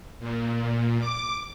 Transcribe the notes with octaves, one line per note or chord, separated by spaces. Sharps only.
A#2
D6